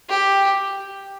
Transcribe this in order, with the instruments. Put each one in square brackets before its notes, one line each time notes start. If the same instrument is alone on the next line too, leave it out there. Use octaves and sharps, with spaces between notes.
[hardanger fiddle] G4